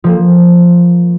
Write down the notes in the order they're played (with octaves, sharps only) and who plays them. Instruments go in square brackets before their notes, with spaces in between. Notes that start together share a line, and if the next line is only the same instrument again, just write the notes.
[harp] F3 A#3